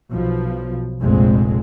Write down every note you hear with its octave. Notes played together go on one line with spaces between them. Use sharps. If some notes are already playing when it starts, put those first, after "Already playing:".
B1 B2 F3
F1 A#1 F2 A#2 G#3 C4